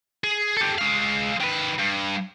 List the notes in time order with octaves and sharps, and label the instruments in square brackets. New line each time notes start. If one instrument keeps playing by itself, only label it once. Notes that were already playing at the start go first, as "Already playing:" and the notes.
[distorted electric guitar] G#4
G4 A4
G#3 F5
D#3 B4
G2